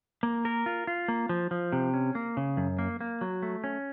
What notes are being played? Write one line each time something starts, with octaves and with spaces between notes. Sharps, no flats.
A#3
A#4
F4
F4
A#3
F3
F3
C3
C#4
A#3
C#3
F#2
A#3
A#3
F#3
A3
C#4